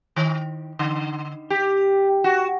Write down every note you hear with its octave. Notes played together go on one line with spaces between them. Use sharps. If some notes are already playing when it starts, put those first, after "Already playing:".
D#3
D3
G4
F#4